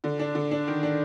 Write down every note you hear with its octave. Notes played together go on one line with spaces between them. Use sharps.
D3
D4
D3
D4
D#3
D4